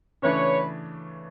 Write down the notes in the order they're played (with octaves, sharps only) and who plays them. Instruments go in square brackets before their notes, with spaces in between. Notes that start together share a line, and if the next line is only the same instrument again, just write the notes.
[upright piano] C#3 E3 A3 D4 [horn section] B4 C#5